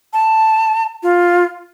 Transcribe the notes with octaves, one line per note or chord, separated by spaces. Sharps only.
A5
F4